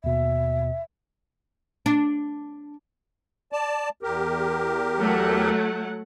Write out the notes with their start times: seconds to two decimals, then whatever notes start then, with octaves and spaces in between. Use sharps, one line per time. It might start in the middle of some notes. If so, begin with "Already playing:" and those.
0.04 D#2 B2 E5
1.86 D4
3.52 D5 A5
4.03 E2 G4 A#4
4.98 F#3 A3 F#5